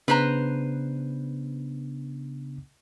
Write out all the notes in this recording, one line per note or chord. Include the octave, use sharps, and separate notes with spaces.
C#3 B3 D4 B4 C5 A#5